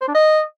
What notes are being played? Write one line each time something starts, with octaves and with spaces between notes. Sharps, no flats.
C5
D4
D#5